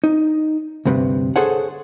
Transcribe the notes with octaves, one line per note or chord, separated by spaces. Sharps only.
D#4
D2 G2 C3 B4
G#4 A4 C5 C#5 F#5